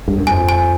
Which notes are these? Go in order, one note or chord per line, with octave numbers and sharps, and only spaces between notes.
G2
F#2
F2 G#5
G#5